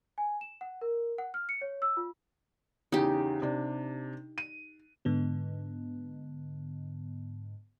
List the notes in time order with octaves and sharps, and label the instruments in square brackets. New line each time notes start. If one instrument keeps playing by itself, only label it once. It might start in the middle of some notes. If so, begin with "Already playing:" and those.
[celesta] G#5
E7
F#5
A#4
F#5
F6
C#7
C#5
E6
F4
[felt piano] E2 C#3 [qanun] D#4 G4
[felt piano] C3 D4
D#7
[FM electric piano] G#2 D3 B3